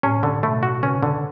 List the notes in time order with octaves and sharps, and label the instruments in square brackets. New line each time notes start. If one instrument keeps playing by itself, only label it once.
[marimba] A2 [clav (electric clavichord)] C#4
[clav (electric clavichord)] D3
[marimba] B2 [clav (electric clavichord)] A3
[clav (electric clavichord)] F#4
[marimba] C#3 [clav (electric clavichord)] C#4
[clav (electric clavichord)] D3